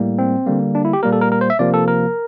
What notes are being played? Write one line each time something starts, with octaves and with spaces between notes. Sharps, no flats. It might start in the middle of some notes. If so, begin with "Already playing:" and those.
Already playing: A2 G3 A#3
C4
D3 G3 A#3
D4
E4
G4
A#2 G3 A#3 A#4
A4
A#4
A#4
C5
E5
C3 F3 A#3 D5
A4
A#4